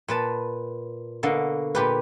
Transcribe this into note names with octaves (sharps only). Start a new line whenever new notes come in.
A#2 B4 A5
B2 D3 A#3
A#2 G4 B4